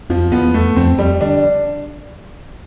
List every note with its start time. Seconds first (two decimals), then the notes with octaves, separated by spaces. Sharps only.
0.10 F2 F3
0.32 E2 B3
0.54 F2 A3
0.76 F2 C4
0.98 F2 G3
1.21 D3 D4